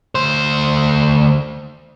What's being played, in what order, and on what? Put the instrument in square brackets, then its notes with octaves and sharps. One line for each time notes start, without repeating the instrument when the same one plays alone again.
[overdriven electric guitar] D2 C5